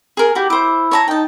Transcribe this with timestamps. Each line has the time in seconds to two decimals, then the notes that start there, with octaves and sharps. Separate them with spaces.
0.17 G#4 A#4
0.35 E4 F#4 G4
0.50 E4 C5 D6
0.91 C#5 A5 A#5
1.08 D#4 G5 A5